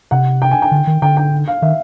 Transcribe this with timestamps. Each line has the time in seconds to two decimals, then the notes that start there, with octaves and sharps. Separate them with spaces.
0.11 C3 F#5
0.42 G5
0.51 G#5
0.62 G5
0.71 D3
0.87 D#3
1.02 D3 G5
1.17 G5
1.48 F5
1.62 D#3 E5